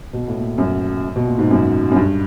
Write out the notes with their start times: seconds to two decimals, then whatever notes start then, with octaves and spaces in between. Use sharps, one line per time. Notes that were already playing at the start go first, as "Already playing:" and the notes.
0.13 B2
0.28 A2
0.36 A#2
0.58 F#2
1.16 B2
1.27 A#2
1.38 G#2
1.51 F#2
1.91 F#2
1.96 G2